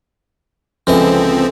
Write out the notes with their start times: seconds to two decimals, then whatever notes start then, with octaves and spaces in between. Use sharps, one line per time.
0.87 C#2 D3 E3 F3 C4 D#5